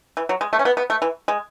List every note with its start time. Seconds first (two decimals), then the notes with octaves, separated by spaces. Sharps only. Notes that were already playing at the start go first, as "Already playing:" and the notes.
0.17 E3
0.29 F#3
0.41 G#3
0.53 A3
0.59 C#4
0.65 B3
0.77 B3
0.90 A3
1.02 E3
1.28 G#3